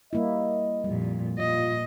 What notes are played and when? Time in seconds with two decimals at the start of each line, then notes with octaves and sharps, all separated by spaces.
0.13 G3 A#3 E4 D#5
0.84 F2 A#2 G3
1.38 A#2 F4 D#5